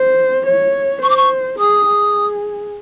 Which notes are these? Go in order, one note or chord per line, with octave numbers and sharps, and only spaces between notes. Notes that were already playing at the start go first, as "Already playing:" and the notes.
Already playing: C5
C#5
C5 C#6
D6
C#6
G#4 D#6
G#4